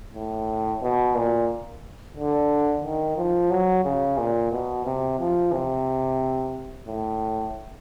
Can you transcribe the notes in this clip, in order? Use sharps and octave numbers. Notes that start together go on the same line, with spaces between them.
A2
B2
A#2
D3
D#3
F3
F#3
C#3
A#2
B2
C3
F3
C3
A2